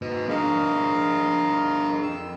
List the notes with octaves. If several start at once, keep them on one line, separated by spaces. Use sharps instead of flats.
G#2 B4 D#5
D4 G#4 A#4 D#5 F5
F2 E6